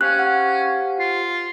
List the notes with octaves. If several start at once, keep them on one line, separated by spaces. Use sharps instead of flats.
C#4 G4 C5 F5 F#6
F#5
F4